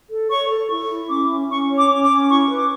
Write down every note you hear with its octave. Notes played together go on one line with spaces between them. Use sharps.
A4
C#5 C#6
A4
E4 C#6
E4
C#4 D6
C#4
C#4 C#6
C#5
D6
C#4
D6
C#4
E4 C#6
B4
D6